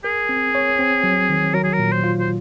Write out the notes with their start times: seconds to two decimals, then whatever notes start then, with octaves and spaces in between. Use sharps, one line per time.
0.04 G#4 A#4
0.29 C4
0.55 C#5
0.79 C4
1.04 F#3
1.29 D#3
1.54 F#3 A#4
1.64 G#4
1.73 A#4
1.79 A#2
1.92 C5
2.04 F4
2.19 C5